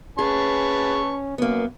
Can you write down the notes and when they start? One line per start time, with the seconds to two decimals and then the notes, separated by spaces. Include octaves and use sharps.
0.19 C#4 G#4 B4 A5 C#6
1.38 F#2 A#3 B3